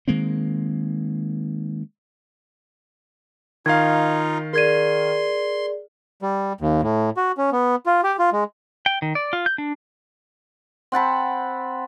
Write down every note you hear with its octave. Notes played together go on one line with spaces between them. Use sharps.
D#3 G#3 A#3 C4
D#3 D#4 F4 F5 G#6
G#4 A#4 D5 C6 G#6 D#7
G3
D#2
A2
F#4
C#4
B3
F4
G4
F4
G#3
G5
D#3
D5
F4
G6
D4
C4 F#5 A5 B5